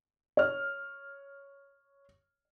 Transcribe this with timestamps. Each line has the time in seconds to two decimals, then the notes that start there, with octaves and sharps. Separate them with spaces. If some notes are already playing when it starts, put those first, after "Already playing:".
0.37 C#5 F6